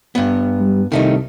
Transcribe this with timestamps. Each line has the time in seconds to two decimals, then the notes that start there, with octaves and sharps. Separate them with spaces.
0.15 G2 B3
0.60 G3
0.92 C2 D#3 A3 D#4